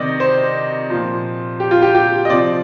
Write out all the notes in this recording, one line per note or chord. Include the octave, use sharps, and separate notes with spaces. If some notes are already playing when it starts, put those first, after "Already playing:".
Already playing: C3 D#3 D5 D#5
C5
A#2 F3
G4
F4
G4
G4
D#5
C3 F3 D5